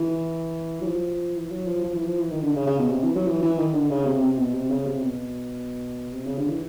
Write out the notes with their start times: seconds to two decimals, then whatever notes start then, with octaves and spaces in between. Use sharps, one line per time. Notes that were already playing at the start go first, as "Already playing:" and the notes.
Already playing: E3
0.82 F#3
0.87 F3
1.36 E3
1.51 F#3
1.68 F3
1.84 F3
1.95 E3
2.07 F3
2.20 E3
2.31 D#3
2.43 D3
2.55 C#3
2.67 C#3
2.79 B2
2.91 C3
3.03 E3
3.15 F#3
3.27 E3
3.42 E3
3.58 D#3
3.74 D3
3.90 C#3
4.06 C3
4.23 C3
4.38 B2
4.54 C3
4.70 C#3
4.87 C3
5.02 B2
6.14 C3
6.26 C#3
6.38 D3
6.49 E3